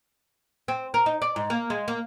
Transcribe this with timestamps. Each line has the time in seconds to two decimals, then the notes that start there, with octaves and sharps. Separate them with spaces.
0.68 C4
0.94 A#4
1.06 D#4
1.22 D5
1.36 G#2
1.50 A#3
1.70 G#3
1.88 A#3